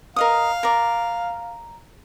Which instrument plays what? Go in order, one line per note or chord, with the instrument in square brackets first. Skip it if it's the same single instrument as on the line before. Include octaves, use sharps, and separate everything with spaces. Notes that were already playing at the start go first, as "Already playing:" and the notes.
[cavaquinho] A#4 D#5 D#6 [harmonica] F5
[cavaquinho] A#4 D5